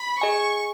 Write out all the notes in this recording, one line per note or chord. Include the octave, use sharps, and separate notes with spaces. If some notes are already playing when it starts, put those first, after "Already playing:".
Already playing: B5
G#4 D#5 G#5 C#6